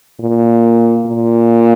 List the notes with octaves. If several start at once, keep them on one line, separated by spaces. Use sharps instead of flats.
A#2
A#2